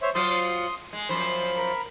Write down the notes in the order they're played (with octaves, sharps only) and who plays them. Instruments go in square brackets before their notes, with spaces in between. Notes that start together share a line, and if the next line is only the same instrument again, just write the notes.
[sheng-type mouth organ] C5 C#5 E5
[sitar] F#3 F4 C5 [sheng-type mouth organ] C6 D#6
[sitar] G#3
[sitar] F#2 F3 C5 [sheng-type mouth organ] B5
[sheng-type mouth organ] A#4 B5